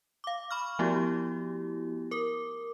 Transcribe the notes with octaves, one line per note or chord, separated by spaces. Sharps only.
F5 D6
B5 C#6 F6
F3 A3 B3 E4 F#4 G4
A#4 D6